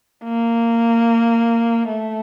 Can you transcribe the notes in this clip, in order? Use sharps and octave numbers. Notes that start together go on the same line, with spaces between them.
A#3
A3